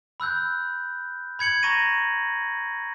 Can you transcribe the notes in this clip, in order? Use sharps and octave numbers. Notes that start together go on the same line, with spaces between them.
B5 E6 F#6 G6
B5 G#6 C#7 F#7
A#5 C#6 A#6 D#7